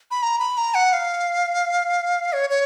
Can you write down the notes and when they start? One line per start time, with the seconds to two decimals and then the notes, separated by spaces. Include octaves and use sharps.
0.11 B5
0.23 A#5
0.39 B5
0.58 A#5
0.75 F#5
0.93 F5
2.33 C#5
2.50 C#5